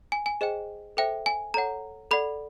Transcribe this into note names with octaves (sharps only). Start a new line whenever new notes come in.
G#5
G#5
G#4 C5 D#5 G5
A4 C5 E5 G5
G#5
A4 C#5 F#5 A#5
A4 D5 F#5 B5